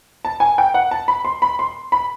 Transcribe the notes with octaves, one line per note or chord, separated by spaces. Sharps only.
A5
G#5
G5
F#5
A5
B5
C6
B5
C6
B5